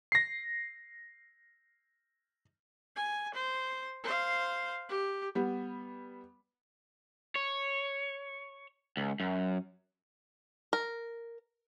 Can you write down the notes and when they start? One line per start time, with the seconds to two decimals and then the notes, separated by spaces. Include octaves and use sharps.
0.12 A#6 C7
2.96 G#5
3.35 C5
4.04 C5 F5
4.89 G4
5.35 G3 B3
7.35 C#5
8.97 C#2
9.20 F#2
10.73 A#4